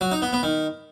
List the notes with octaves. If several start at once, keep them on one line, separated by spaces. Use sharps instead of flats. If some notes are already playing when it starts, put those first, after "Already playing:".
F#3
D#4
B3
B3
D#3